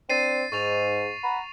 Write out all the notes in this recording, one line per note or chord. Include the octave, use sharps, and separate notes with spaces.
C4 D4 A6 C7 D#7
G#2 C#6 A6 F7
F#5 A#5 B5